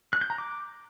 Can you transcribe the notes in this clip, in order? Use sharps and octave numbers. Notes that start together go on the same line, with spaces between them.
F#6
G6
A#5
D6